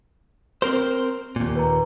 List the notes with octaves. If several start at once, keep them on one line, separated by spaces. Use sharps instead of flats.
C4 A#4 C5
D#2 A#2
B4 A#5